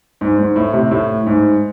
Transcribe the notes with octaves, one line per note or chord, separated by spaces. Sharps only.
G#2
G#2
A2
C3
A2
G#2